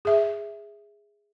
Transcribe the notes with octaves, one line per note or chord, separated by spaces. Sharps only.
G#4 E5